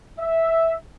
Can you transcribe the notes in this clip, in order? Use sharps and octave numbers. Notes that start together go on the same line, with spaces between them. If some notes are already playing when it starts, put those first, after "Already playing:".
E5